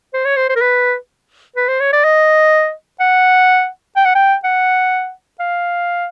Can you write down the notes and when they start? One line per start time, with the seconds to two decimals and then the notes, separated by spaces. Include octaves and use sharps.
0.13 C5
0.25 C#5
0.36 C5
0.49 C5
0.56 A#4
0.61 B4
1.56 B4
1.68 C5
1.80 C#5
1.93 D5
2.04 D#5
3.00 F#5
3.96 G5
4.05 F#5
4.15 G5
4.44 F#5
5.40 F5